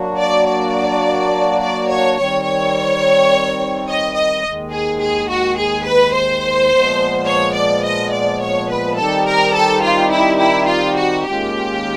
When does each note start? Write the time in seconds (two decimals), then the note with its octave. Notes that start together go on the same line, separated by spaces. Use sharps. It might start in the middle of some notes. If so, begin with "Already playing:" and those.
Already playing: F#3 A#3 D4 F#4
0.19 D5
0.47 D5
1.60 D5
1.88 C#5
2.17 D#3 G3 C4 C#5
2.45 C#5
3.88 D#5
4.15 D#5
4.44 D#2 D#3 G#3
4.73 G#4
5.00 G#4
5.29 F#4
5.58 G#4
5.86 B4
6.14 C5
6.71 A#2 F3 G#3 B3
7.27 C#5
7.56 D5
7.84 D#5
8.12 D5
8.42 C#5
8.70 B4
8.97 D#3 G3 C4 D#4 G4 A4
9.26 A#4
9.55 A4
9.84 F4
10.11 E4
10.40 E4
10.68 F4
10.97 F#4
11.25 D#2 D#3 G#3 C#4 F4 G4